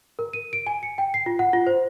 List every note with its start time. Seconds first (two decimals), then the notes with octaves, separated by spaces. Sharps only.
0.19 A#4
0.33 D#7
0.53 D7
0.67 G#5
0.83 C#7
0.98 G5
1.14 C7
1.26 F4
1.39 F#5
1.53 F4
1.67 C5